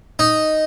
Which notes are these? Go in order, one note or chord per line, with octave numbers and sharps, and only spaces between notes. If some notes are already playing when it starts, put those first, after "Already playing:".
D#4